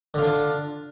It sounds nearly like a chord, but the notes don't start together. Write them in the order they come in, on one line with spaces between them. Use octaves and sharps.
D3 F4 D4